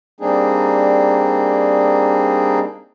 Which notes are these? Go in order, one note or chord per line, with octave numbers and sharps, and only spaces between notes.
G3 A#3 C4 D4 D#4 G#4